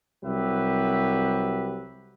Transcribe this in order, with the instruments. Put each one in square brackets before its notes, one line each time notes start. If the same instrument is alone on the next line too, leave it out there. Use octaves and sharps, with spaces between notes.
[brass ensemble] C2 F#3 G4 B4 E5